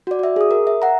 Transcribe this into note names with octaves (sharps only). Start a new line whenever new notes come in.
F#4 D5
F#4 E5
G#4 D#6
A#4
E5
F#5 A#5